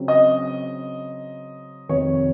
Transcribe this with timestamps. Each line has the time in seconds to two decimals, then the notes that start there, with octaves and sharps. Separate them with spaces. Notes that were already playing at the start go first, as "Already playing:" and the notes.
Already playing: C#3 F#3 C4
0.08 D#5
1.89 F2 C3 D#3 C#5